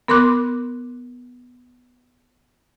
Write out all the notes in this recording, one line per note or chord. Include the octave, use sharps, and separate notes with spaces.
B3 A#4 C6 D6 F#6